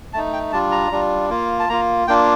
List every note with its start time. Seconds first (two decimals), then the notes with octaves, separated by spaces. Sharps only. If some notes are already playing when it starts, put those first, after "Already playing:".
0.13 A3 D#4 A5
0.33 G5
0.52 G3 D4 F4 A5
0.72 A#5
0.91 G3 D4 F4
1.30 A#3 F4
1.59 A5
1.69 A#3 F4 A#5
2.08 A#3 D4 F4 G5